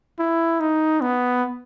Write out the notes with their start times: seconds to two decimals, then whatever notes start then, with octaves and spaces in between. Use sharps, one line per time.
0.19 E4
0.60 D#4
1.01 B3